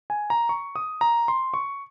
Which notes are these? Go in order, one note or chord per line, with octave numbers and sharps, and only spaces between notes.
G#5
A#5
C#6
D#6
A#5
C6
C#6